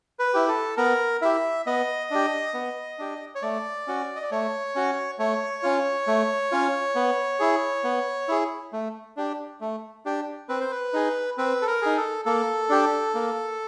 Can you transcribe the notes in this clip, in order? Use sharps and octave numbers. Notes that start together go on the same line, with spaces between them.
B4
E4 G4
A4
B3 A#4
E4 G4 E5
B3 D#5
D4 G4
B3
D4 G4
C#5
A3 D5
C#4 F#4
D#5
D5
A3 C#5
C#4 F#4
A3 C#5
C#4 F4
A3
C#4 F4
B3
E4 G#4
B3
E4 G#4
A3
D4 G4
A3
D4 G4
C4 B4
C5
B4
D#4 G#4
C4 B4
A4
A#4
D#4 G#4
A4
A#3 A4
D4 G4
A#3